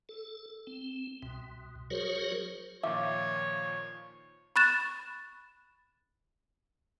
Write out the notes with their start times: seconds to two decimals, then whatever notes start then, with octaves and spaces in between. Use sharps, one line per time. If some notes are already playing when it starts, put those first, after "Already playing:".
0.09 A4
0.67 C4
1.22 C2 B2
1.90 F#3 F#4 G#4 A#4 C5 C#5
2.83 A#2 D#3 F3 C#5 E5 F5 D6
4.56 B5 C#6 F#6 A6 E7